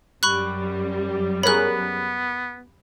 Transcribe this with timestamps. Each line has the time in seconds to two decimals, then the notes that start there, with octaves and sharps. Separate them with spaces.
0.23 F#2 G3 B5 C#6 F#6
1.43 B3 G#4 A#4 C#5 B5 F#6